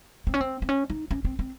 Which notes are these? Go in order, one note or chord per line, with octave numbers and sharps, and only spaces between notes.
C4
C#4
C4
C4
C#4
D#4
C#4
C4
C4